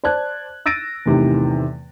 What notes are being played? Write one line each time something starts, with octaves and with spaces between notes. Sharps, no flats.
C5 D5 A5 F#6 G#6
E6 A6 A#6 D7 D#7
E2 A2 C3 D#3 E3